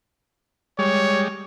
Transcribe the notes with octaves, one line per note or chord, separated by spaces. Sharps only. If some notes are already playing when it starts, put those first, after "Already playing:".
G3 G#3 C#5